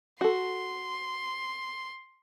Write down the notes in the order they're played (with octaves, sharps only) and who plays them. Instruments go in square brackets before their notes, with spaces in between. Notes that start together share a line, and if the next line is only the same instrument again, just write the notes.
[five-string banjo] F#4 A4 [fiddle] C6